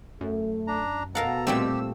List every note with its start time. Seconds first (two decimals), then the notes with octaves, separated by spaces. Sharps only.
0.21 F#2 A3
0.67 D4 A#5
1.15 B2 A4 A#4 F5 F#5 A#5
1.47 A#2 G3 A3 C4 G4 E6